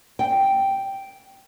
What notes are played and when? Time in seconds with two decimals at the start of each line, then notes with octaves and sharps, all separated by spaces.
0.19 G5